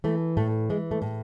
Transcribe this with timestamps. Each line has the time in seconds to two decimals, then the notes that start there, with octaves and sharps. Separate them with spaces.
0.04 E3 A3
0.37 A2 A3
0.69 E3 G#3
0.91 A3
1.02 A2